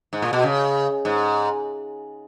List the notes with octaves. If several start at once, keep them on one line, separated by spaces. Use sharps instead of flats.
G#2
A#2
B2
C#3
G#2